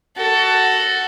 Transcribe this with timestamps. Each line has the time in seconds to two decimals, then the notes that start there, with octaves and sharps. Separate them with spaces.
0.17 F#4 A4